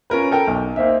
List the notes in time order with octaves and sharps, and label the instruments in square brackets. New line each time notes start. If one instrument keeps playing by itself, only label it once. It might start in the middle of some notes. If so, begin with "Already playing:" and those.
[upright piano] C#4 F4 A#4 B4
A4 A#4 G5
B1
A#3 C4 D#4 E5